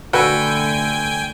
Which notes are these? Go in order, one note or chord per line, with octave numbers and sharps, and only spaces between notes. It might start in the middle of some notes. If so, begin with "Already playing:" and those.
D3 A3 F#4 A4 B4 G5 G#5